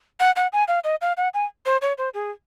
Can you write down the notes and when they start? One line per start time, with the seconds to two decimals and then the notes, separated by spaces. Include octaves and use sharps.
0.20 F#5
0.36 F#5
0.53 G#5
0.68 F5
0.84 D#5
1.02 F5
1.17 F#5
1.34 G#5
1.66 C5
1.82 C#5
1.98 C5
2.14 G#4